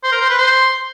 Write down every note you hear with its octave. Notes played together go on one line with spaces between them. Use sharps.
C5
A#4
C5
B4
C5